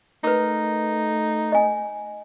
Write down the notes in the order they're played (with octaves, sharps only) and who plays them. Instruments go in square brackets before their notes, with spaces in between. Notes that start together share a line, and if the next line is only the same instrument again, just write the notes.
[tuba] A3 [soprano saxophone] D#4 [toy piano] A#4 B4
[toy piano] D#5 G#5